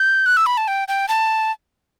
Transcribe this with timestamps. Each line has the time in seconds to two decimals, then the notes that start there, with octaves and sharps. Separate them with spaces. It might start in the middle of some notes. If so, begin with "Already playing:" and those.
Already playing: G6
0.26 F#6
0.37 E6
0.46 B5
0.57 A5
0.68 G5
0.88 G5
1.08 A5